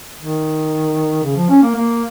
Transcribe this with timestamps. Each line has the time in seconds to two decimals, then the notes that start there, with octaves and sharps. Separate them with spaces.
0.18 D#3
1.23 C#3
1.36 F3
1.49 C#4
1.62 A#3
1.75 A#3